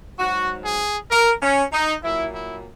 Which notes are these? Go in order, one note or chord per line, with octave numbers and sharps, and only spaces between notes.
G#2 F#3 F#4
G#4
A#4
C#4
D#4
A#2 F#3 E4
E4